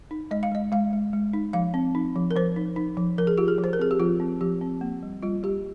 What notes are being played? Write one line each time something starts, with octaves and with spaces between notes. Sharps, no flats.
D#4
G#3 D#5
F5
G#3 D#5
G#3 F5
G#3
G#3
D#4
F3 F5
C4
D#4
F3
A#4
F3 C5
D#4
D#4
F3
F3 A#4
G#4
F4 G4
G#4
F3
C5
A#4
C4 G#4
G4
F3 F4
C4
F3 G4
C4
A#3
G3
G3 F4
G3 G4